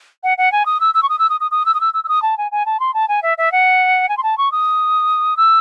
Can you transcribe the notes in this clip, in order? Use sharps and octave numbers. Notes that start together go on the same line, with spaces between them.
F#5
F#5
G#5
D#6
E6
E6
C#6
D#6
E6
D#6
D#6
D#6
E6
D#6
E6
E6
E6
D#6
A5
G#5
G#5
A5
C6
A5
G#5
E5
E5
F#5
G#5
C6
A5
C#6
D#6
E6